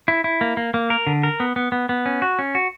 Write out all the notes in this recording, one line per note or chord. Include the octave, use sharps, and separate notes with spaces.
E4
E4
A#3
A#3
A#3
A#4
D3
A#4
B3
B3
B3
B3
C#4
F#4
C#4
F#4